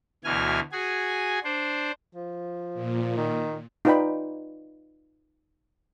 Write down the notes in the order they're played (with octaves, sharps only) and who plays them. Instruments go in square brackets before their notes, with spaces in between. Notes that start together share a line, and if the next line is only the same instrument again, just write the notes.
[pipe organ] D2 B2 E3 G#5 F6
F#4 G#4 G#5
D4 C5
[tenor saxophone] F3
[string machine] A#2
[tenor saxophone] D#3
[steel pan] D#4 F4 B4 D5 G5 B5